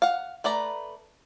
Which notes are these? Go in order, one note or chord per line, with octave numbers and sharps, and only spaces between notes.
F5 F#5
A3 B4 D5 A#5